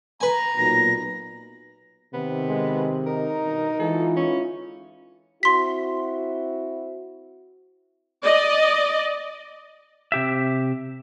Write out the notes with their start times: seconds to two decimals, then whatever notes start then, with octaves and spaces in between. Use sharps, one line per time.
0.21 B4 G#5 A#5
0.57 B1 A#2 A#6
2.14 C3 D#3 B3
2.48 G#3
3.07 D#4 A#4
3.42 G2 B2 D#3
3.80 D3 E3 G#3 F4 A4
4.16 C#4 E4
5.43 C4 E4 F#4 C6 B6
8.23 D5 D#5
10.12 C3 G4 E5